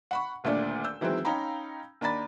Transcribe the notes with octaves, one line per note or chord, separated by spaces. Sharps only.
F#5 B5 C#6
D#1 D2 A#2 A3 D4 D5
E6 G6
D#3 E3 F#3 G#3 C4
C#4 D#4 F5 G5 A#5 B5
D#2 D4 A#5 B5 A6